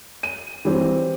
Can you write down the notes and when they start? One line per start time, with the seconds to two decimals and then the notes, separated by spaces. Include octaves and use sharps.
0.23 D#7
0.65 E3 G3 C4